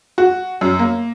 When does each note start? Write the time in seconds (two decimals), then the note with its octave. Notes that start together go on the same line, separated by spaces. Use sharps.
0.18 F#4
0.61 F#2
0.79 A#3